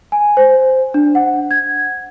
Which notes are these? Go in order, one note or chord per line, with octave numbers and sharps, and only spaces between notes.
G#5
C5
D4
F#5
G#6